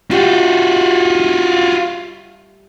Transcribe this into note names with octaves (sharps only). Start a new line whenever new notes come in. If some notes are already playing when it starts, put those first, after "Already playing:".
G3 A3 F4 F#4